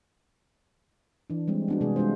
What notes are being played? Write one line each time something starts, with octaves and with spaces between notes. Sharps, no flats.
E3 D4
G3 G#3 C4
B3 D4 F#4
C3 G#3 G#4
G3 G#3 D4 F4 C5